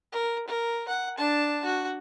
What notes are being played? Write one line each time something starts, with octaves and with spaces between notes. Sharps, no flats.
A#4
A#4
F#5
D4 A5
F#4